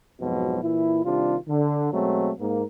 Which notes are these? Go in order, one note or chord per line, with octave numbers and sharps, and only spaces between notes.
F2 G#2 B2 F3 F#3
A#2 E3 E4
C3 D#3 G3 D4 F4
D3
B2 F#3 G#3 A3 C4
G#2 A#3